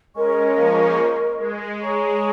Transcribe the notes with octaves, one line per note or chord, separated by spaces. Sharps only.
G#3 C#4 A#4 D#5 C#6
F3 A#3
G#3
G#3 G#4 C#5 A#5 C#6